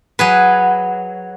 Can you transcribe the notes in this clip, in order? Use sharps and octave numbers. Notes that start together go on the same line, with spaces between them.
F#3 G#4 B4